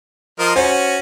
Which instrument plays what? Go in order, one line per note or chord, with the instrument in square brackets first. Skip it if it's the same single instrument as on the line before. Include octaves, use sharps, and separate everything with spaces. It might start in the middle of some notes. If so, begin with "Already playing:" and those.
[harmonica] F3 A#4 D#5
[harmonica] C#4 F#4 [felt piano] C5